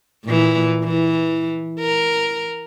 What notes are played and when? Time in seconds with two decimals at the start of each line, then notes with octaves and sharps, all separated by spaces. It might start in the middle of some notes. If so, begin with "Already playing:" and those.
0.24 A#2 E3
0.84 E3
1.79 A#4